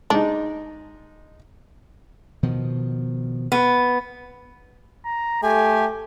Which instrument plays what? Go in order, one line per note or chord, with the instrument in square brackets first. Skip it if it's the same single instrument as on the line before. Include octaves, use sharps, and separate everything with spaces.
[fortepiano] G#3 D#4 [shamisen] D4
[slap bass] B2 D#3 F3
[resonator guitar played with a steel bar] B3
[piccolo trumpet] A#5
[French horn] A3 [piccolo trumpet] G4 [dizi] G#5